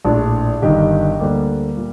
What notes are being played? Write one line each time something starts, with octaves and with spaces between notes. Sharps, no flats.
A#1 A2 D4 F4
G1 G2 D#3 D#4 G4
D2 D3 G3 A#3
A#2